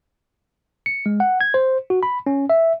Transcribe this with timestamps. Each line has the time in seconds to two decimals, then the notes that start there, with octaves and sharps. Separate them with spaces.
0.86 C#7
1.06 G#3
1.20 F#5
1.41 G#6
1.54 C5
1.90 F#4
2.03 B5
2.26 C#4
2.50 E5